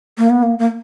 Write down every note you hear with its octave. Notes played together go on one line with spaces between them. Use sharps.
A#3
B3
A#3
A#3